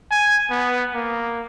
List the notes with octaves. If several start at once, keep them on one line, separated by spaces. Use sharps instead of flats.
G#5
B3
A#3